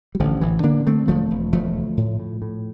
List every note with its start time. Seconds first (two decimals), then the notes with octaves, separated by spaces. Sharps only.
0.15 G3
0.20 A1 D3 F3
0.41 A1 E3
0.63 D3 A#3 D4
0.86 D3 A3 C4
1.08 E1 F3 A3
1.31 E1
1.52 E1 F3 A3
1.76 D2
1.97 A2
2.19 A2
2.42 A2